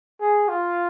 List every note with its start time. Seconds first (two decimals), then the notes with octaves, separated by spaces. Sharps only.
0.20 G#4
0.49 F4